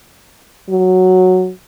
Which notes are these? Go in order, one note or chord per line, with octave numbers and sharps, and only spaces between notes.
F#3